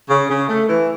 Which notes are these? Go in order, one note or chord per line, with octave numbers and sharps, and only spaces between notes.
C#3
C#3
A3
E3